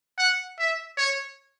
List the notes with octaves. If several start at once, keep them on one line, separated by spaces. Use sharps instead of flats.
F#5
E5
C#5